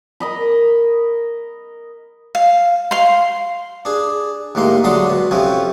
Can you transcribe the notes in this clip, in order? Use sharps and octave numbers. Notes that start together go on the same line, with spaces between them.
A#4 D#5 B5
F5
F5 C6
D4 G#4
D#2 A2 G#3 A#3 C6
D3 F#3 G#3 D4 C6 D#6
B2
F2 C3 F3 C4 C#4